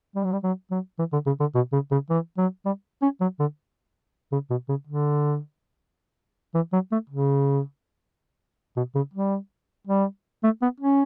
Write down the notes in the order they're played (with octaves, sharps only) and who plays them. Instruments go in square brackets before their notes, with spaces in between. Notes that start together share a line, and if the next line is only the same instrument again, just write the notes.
[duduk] G3
F#3
G3
F#3
F#3
E3
D3
C#3
D3
B2
C#3
C#3
E3
F#3
G3
C#4
F#3
D3
C#3
B2
C#3
D3
E3
F#3
A3
C#3
B2
C#3
G3
G3
A3
B3
C#4